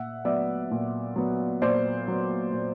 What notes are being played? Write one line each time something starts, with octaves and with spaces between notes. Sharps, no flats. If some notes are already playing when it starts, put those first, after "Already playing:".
Already playing: A#2 E5 F#5
F#3 B3 D5 E5
A#2
F#3 B3
A#2 C5 D5
F#3 B3
A#2